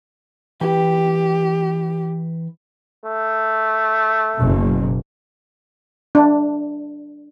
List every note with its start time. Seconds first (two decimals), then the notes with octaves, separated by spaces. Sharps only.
0.61 E3 G4 B4 G5
3.06 A3
4.37 F#1 B2
6.15 D4